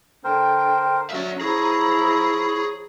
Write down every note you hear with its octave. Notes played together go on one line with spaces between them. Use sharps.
D3 A#4 C5 G5
F#3 C#4 D5 E5
F3 E4 G#4 C#5 A#5